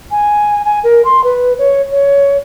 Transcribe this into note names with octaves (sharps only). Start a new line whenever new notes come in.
G#5
G#5
A#4
C6
B4
C#5
C#5